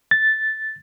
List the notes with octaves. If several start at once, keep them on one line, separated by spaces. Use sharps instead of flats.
A6